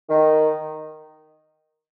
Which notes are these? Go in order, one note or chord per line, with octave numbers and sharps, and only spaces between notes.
D#3